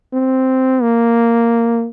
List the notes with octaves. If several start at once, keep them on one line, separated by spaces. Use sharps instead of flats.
C4
A#3